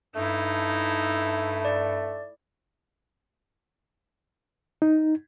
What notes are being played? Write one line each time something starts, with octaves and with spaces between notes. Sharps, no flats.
G2 A3 D#4 E4
D5
D#4